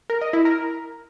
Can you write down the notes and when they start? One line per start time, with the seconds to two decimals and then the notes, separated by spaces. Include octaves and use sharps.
0.10 A#4
0.21 D#5
0.33 E4
0.45 A#4